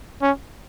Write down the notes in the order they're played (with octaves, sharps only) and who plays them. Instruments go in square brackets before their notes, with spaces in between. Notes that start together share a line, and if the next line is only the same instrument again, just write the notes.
[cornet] C#4